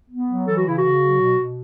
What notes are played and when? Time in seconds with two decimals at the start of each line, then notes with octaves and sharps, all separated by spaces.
0.10 B3
0.28 F#3
0.46 E3 A4
0.57 F#4
0.65 C#3 E4
0.78 C#3 F#4
1.01 F#3
1.20 B2
1.38 B2